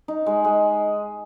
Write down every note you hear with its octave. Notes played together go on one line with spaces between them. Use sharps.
D#4
G#3
G#3